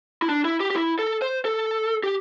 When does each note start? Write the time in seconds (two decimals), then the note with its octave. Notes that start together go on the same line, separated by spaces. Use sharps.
0.22 E4
0.29 D4
0.45 E4
0.60 G4
0.70 G4
0.76 E4
0.99 A4
1.22 C5
1.45 A4
2.03 G4